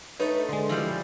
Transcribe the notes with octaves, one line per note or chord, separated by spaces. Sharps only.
A3 D#4 B4 C#5
D3 G#3 C6
E3 F3 G3